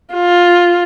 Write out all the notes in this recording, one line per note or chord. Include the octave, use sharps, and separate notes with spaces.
F4